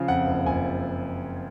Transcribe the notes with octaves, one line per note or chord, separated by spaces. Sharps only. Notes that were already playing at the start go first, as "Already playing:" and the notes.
Already playing: C#3 F3 F5
F2 F#5
F#1
F#1 G#5